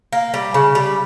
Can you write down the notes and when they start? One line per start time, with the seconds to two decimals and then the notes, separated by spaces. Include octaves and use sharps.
0.13 A#3
0.34 G3
0.54 C#3
0.75 G3